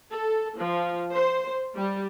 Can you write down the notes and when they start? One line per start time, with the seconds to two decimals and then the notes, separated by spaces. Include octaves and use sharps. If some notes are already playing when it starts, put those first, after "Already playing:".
0.14 A4
0.59 F3
1.13 C5
1.75 G3